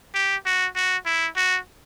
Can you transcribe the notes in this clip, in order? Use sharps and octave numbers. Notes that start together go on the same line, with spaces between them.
G4
F#4
F#4
E4
F#4